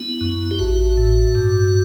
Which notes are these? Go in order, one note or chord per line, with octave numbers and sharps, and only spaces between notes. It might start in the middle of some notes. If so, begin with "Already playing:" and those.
Already playing: B3 E4
F#2
G4
A1 F#4
A2
G2